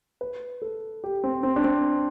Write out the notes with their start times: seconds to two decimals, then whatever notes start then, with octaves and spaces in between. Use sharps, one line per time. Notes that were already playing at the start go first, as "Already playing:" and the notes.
0.21 B4
0.62 A4
1.04 G4
1.24 C4
1.43 C4
1.56 D4
1.64 C4